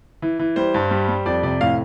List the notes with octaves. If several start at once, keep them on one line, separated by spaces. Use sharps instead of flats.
E3
E3
G3 C5
G2
G3
G3
F2 D5
C3 D5
A2 F5